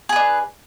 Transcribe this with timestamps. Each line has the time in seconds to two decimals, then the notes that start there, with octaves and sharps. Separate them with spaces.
0.09 G#4
0.13 B4
0.16 D4